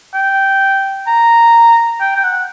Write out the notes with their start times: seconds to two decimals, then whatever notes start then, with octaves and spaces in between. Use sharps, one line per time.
0.14 G5
1.07 A#5
2.00 G5
2.16 G5
2.24 F#5